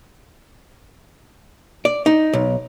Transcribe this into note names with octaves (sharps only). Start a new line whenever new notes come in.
D5
D#4
B1